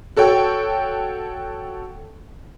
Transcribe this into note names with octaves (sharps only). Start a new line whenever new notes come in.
F#4 A4 C#5 G5